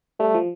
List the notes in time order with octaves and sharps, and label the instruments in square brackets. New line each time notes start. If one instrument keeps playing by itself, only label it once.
[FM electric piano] G3 [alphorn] A3
[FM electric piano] F3